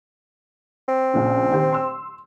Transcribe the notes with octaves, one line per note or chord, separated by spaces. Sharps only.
C4
A#1 A#2 C#3
D#3 G4 C5
C6 E6